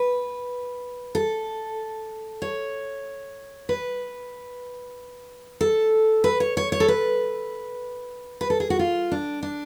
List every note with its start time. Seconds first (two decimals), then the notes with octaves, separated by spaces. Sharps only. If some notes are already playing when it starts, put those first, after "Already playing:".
Already playing: B4
1.15 A4
2.42 C#5
3.69 B4
5.61 A4
6.24 B4
6.40 C#5
6.57 C#5
6.72 C#5
6.80 A4
6.88 B4
8.41 B4
8.50 A4
8.60 G#4
8.70 F#4
8.79 F4
9.12 D4
9.43 D4